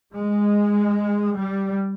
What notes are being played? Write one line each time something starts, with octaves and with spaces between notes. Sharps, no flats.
G#3
G3